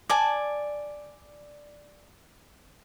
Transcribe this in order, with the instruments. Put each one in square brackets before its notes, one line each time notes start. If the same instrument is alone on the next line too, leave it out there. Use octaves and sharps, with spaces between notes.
[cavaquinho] D5 G#5 A5